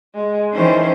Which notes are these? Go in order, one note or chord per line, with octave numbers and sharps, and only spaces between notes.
G#3
D#3 E3 C#4 C5